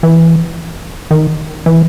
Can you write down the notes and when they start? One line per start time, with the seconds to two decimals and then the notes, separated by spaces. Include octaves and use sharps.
0.03 E3
1.11 D#3
1.66 E3